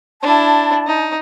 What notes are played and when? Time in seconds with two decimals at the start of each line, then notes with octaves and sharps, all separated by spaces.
0.22 D4 E4 A5
0.86 D#4